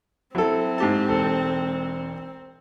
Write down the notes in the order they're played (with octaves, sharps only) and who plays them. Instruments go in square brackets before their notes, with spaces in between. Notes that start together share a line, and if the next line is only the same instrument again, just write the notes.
[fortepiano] F#3 A4 [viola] C4 [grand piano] E4
[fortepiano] G#2 G4 A5
[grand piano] E1 A4